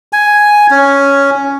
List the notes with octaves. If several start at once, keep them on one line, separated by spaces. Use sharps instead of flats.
G#5
C#4